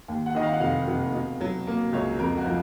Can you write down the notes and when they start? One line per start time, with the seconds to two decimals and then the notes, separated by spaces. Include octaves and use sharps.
0.08 D#2
0.26 F#5
0.35 D#3 D#5
0.43 F5
0.53 F#5
0.60 F1 F5
0.87 F1
1.14 B2
1.41 F#3
1.67 A#3
1.93 C#2 C#5
2.19 F2 A#4
2.37 F#4
2.46 F3